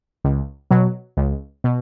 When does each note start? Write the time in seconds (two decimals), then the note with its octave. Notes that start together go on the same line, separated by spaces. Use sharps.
0.24 C#2
0.71 B2 F#3
1.17 C#2
1.64 B2